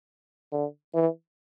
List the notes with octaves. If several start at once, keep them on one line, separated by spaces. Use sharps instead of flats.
D3
E3